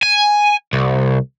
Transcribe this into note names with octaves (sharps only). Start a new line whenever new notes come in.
G#5
C2